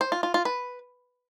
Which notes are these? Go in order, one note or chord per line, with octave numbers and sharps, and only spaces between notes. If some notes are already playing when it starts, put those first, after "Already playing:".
C5
F4
F4
F4
B4